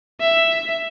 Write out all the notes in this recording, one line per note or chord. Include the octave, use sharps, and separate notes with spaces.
E5